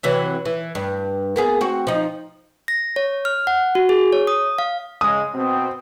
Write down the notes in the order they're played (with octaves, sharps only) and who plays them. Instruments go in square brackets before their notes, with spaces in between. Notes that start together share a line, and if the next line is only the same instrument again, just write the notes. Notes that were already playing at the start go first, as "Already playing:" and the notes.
[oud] C3 E3 F#3
E3
G2
A#3 B3 G#4
C4 F#4
F3 D#4
[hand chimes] A#6
C#5
F6
F#5
F#4
G#4
C#5
D#6
F5
[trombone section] C#3 G#3 [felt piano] D#6
[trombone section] B2 C4